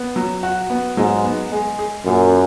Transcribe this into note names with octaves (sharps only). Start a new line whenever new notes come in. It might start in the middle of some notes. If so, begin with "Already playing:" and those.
Already playing: B3
F#3
F#4
B3
G#2 F#3
B3
G#3
G#4
F#2 A#2